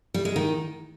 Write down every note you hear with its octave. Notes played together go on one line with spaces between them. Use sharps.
G3
G#3
D#3